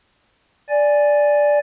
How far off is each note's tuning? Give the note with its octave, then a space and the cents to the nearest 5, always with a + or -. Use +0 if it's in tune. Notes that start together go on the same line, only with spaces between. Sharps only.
D5 -5 G#5 +0